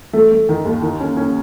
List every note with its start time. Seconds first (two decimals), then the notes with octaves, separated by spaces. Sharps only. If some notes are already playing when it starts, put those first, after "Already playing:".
0.13 A3
0.31 A3
0.49 D#3
0.65 D#2
0.82 D#3
1.00 C#4
1.17 C#4